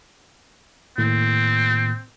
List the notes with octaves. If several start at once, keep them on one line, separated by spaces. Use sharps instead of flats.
A2 D#3 A#3 C4